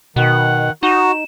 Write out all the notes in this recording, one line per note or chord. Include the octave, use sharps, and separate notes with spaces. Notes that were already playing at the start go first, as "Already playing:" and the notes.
B2 D#3 F#5
D#4 F#4 E7